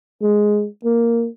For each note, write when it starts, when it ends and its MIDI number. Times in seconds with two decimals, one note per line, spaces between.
0.22 0.66 56
0.85 1.28 58